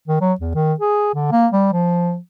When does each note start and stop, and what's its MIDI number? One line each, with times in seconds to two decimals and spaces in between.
0.08 0.21 51
0.21 0.33 54
0.40 0.53 40
0.55 0.73 51
0.80 1.14 68
1.14 1.27 50
1.32 1.47 58
1.52 1.72 55
1.73 2.17 53